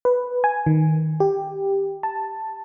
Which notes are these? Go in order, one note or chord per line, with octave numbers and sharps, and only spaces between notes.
B4
G#5
D#3
G4
A5